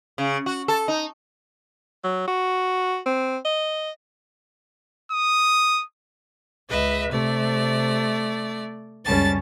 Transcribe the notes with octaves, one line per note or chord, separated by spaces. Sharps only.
C#3
F#4
A4
D#4
F#3
F#4
C4
D#5
D#6
C#2 B4 D#5 E5
C3 A3 D5
C#2 F#2 G3 C#4 A5 A6